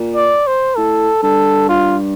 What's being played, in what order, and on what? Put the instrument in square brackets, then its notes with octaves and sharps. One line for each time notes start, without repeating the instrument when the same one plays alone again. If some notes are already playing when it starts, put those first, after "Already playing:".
Already playing: [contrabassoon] A#2
[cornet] D5
C5
[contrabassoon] A2 [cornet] A4
[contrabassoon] G2 [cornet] A4
[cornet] F4